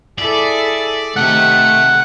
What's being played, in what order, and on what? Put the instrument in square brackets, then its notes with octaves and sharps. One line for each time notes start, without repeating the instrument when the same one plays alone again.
[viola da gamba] E4 G#4 A4 [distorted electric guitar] D5
[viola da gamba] C3 D#3 [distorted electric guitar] A3 A4 [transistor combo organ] F#5